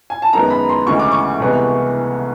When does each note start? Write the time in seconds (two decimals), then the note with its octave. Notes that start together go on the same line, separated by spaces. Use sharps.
0.10 G#5
0.22 A5
0.33 F#2 D#3 G#3 B3 A#5
0.51 B5
0.69 C6
0.87 D2 C#3 E3 G#3 C#6
0.99 D6
1.11 C#6
1.40 C2 C3 E3 G#3 B3